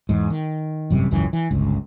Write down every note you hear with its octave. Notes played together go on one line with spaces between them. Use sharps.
E2 G#2
D#3
G#1 F#2 C3 G3
G#1 C#2 F#2 E3
E3
G1 C#2